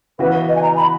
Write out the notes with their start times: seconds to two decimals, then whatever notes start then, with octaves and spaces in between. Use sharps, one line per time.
0.19 C#3 E3 B3 F#4 B4
0.49 D#5
0.55 G#5
0.63 A#5
0.77 B5